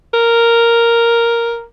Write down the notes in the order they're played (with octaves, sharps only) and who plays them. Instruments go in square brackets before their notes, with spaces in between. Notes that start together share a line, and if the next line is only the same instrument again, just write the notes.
[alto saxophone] A#4